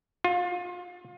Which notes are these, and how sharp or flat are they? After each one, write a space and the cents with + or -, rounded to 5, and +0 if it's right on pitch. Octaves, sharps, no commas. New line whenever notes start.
F4 +30